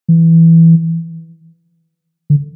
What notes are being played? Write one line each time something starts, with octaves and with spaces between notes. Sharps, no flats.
E3
D3